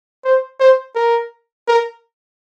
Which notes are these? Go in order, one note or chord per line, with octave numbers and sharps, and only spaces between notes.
C5
C5
A#4
A#4